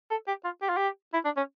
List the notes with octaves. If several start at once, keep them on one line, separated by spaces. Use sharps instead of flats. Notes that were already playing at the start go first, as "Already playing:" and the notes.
A4
G4
F4
G4
F4
G4
E4
D4
C#4